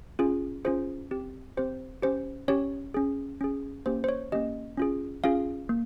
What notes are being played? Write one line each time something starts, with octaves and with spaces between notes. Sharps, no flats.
C#4 F4 G#4
C#4 F4 G#4 C5
C4 G4
C4 G4 C5
C#4 G4 C5
C#4 G4 C#5
C#4 G#4
C#4 G#4
A#3 C#4 G4 C5
C5
C#5
A#3 C#4 G4 D#5
C#4 F4 G#4
C#4 F4 G#4 F5
A#3